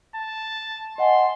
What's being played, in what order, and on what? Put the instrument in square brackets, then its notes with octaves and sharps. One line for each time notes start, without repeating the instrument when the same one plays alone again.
[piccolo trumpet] A5
[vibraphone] D#5 F#5 G#5 [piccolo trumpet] C6